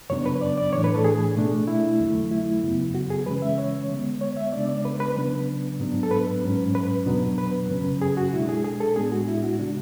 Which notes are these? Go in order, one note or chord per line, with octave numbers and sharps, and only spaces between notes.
F#2 C#3 F#3 B3 D4 C#5
B4
D5
D5
A2 E3 A3 D4 C#5
B4
A4
G#4
B2 A3 D4
E4
E2 D3 F#3 A3
E4
F#2 C#3 F#3 B3
F#4
G#4
C#3 E3 G#3 C#4 B4
E5
C#5
D3 G#3 B3
C#5
E5
C#3 G#3 B3 D4 D5
D5
B4
B4
C#3 F#3 B3 D4 B4
G#2 F#3 B3 D4
A4
B4
G#2 F#3 C#4
B4
E2 B2 F#3 B3 D4
B4
F#2 C#3 F#3 C#4
G#4
F#4
B2 G#3 D4 E4
G#4
G#4
A4
A2 G#3 B3 D4 G#4
F#4
E4
F#4
C#3 G#3 D4